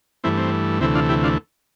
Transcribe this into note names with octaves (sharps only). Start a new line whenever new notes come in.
G2 E3 A3 C4 E4
C4
D2 C3 E3 A3 C4 E4
D4 F4
E4 G4
D4 F4